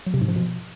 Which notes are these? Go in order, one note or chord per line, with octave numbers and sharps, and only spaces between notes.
F#3
C3
G#2
F3
B2